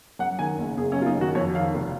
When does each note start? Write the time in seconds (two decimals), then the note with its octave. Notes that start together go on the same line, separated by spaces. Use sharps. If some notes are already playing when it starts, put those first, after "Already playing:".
0.19 F#2 F#5
0.39 D#3 G#5
0.58 F#1
0.77 F#1 G#4
0.92 C#4
0.96 F#2
1.02 F4
1.06 D#4
1.17 D#3 F#4
1.35 F2 C#5
1.55 D#3 F5
1.74 F1